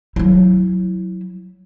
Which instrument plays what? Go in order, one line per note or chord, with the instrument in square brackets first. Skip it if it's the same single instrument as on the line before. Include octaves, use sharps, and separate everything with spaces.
[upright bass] F#3 E4